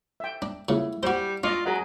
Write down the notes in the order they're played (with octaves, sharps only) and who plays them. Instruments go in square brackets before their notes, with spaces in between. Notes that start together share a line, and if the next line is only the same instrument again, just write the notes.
[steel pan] E5 G5
[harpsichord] D4
[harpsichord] A#2 C#3 [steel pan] E4
[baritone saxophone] G3 [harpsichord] F#4 C5
[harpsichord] D4 [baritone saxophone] F4 [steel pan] D5 D#5 C#6
[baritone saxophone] F#3 [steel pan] G#4 A#4 D#5